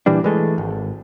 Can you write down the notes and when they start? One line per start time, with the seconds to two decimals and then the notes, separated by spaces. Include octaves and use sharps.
0.06 A#2 E3 G3 D4
0.24 E3 G#3 A3
0.58 G#1